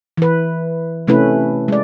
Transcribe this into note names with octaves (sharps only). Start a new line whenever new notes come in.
E3 B4
C3 A3 C#4 E4 B4
G#3 D5